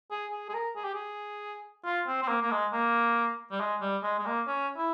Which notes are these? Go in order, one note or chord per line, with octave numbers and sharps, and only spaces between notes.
G#4
G#4
G#4
A#4
G#4
G4
G#4
F4
C4
C4
A#3
A#3
G#3
A#3
G3
G#3
G3
G#3
G#3
A#3
C#4
E4